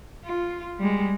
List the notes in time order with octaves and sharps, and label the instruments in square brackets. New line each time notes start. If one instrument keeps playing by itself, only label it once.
[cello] F4
G3 G#3